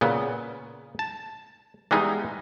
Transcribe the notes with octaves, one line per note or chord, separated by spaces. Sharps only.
A#2 C#3 B3
A5
E3 G3 G#3 B3 D#4